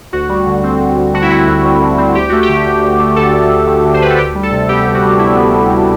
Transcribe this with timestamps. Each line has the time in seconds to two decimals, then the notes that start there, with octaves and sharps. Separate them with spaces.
0.13 D2 F#4
0.29 G3
0.47 D3
0.64 C4
0.80 D2
0.97 G3
1.14 D3 F#4
1.22 E4
1.31 C4 F#4
1.47 D2
1.65 G3
1.82 D3
1.98 C4
2.15 D2 G4
2.29 A3 F#4
2.43 G4
2.49 D3
2.66 D2
2.83 D2
3.00 A3
3.16 D3 A4
3.33 D2
3.51 D2
3.67 A3
3.85 D3
3.94 C5
4.02 D2 B4
4.10 A4
4.18 D2 G4
4.35 G3
4.43 A4
4.52 C3
4.69 B3 G4
4.85 D2
4.94 F#4
5.02 G3
5.19 C3 E4
5.36 B3
5.54 D2
5.70 G3